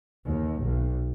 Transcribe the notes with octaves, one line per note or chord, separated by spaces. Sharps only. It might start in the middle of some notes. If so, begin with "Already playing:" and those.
D#2
B1